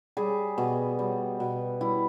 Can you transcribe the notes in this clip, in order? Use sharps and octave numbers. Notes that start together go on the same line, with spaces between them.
G3 G#4
B2
G3
B2
G3 E4